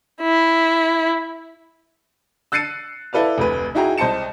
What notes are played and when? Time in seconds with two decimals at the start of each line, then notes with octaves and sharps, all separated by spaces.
0.22 E4
2.52 E6 F#6 A6 C7 C#7 D#7
3.13 E4 A4 B4 D5 F5
3.38 F1 D2 B4
3.75 D#4 E4 F#4 G#4 G5 A#5
3.98 C2 C5 D#5 A5 C#7 E7